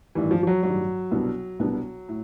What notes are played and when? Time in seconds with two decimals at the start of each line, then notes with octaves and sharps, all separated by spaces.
0.15 A1 G2 D#3 E3 G3
0.31 F3
0.43 F3
0.47 F#3
0.63 A1 G2 D#3 F#3 G3
1.11 C2 B2 G3 B3 D4
1.59 C2 B2 G3 B3 D4
2.09 A2